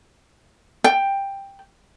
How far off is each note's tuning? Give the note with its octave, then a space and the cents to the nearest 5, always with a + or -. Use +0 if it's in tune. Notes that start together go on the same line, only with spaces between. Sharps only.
G5 +10